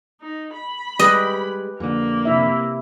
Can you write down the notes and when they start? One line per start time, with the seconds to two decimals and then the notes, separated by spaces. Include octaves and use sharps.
0.21 D#4
0.54 B5
0.99 G3 G#3 G4 B4 D#5
1.80 F2 D3 A#3
2.25 C3 E4 E5